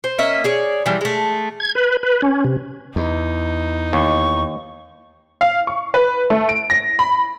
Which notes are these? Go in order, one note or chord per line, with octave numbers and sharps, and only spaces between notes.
C5
A#3 C#4 D#5 E5
G#4 C#5 D5
E3 F3 G3
G#3 A3
G#6
B4
B4
C#4
C3
E2 D#4
D#2 C#6
F5
C#6
B4
A3
D7
A#6
B5